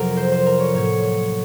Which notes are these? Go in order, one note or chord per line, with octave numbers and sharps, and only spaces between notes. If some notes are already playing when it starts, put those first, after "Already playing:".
Already playing: F2 C3 F#3 A#4
C5
C5
A#4
C#5
A2 F#3 A#3 C#5
C#5